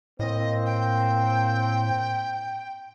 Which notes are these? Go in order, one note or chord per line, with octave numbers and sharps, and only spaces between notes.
A2 A#3 C4 D#5
G5